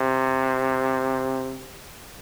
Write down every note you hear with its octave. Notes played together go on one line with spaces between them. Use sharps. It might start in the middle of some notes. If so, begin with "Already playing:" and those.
Already playing: C3